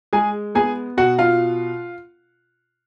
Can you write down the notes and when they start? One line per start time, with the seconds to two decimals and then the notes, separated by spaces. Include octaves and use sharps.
0.13 G#3 G#4 G#5
0.55 B3 G#4 G#5
0.97 B2 F#4 F#5
1.19 F4 F5